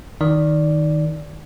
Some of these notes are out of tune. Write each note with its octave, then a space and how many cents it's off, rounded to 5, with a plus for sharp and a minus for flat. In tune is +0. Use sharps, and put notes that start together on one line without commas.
D#3 +0 D#4 +0 D5 -10